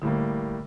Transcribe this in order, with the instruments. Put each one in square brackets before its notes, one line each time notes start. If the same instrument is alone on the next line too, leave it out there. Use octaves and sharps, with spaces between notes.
[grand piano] A2 G3 A#3 [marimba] D3